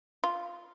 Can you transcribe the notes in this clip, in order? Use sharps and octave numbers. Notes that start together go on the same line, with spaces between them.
F4